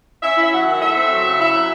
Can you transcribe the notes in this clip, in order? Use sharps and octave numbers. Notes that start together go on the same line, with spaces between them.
C#4 E5
E4 E5
F#3 F#5
D#3
A3 E5
C4
F#3
C#3
E4 E5
F#3